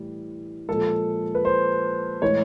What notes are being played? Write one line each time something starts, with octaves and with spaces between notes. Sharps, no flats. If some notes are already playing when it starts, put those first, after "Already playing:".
Already playing: A2 E3 G3
A#2 F3 G#3 A4
B4
C5
A2 E3 G#3 C#5